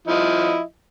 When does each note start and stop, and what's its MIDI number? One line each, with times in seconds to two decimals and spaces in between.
0.07 0.60 53
0.07 0.60 64
0.07 0.60 75